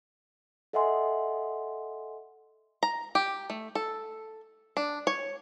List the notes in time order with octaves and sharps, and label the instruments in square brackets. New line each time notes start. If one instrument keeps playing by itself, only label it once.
[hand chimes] A4 D#5 E5 F#5 G#5 C6
[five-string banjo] A#5
G4
A3
A4
D4
C#5